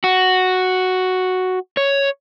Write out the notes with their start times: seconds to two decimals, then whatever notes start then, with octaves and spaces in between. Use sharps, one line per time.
0.04 F#4
1.77 C#5